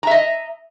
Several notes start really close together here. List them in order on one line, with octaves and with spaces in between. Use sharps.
A#5 E5 D#5